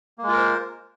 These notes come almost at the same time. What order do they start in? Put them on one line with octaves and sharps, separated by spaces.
A#3 G#3 F4 A#4 C5